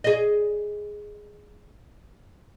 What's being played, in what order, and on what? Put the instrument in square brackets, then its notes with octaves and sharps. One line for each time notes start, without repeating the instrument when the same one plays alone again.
[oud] G#4 D#5